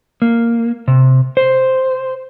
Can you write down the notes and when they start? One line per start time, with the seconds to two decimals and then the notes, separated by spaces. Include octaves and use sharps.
0.22 A#3
0.88 C3
1.37 C5